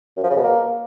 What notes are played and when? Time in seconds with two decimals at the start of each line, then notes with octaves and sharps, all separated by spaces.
0.17 F#2
0.23 F3
0.30 C#3
0.37 B2
0.43 A#3